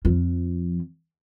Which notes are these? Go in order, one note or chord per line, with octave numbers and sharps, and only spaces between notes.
F2 F3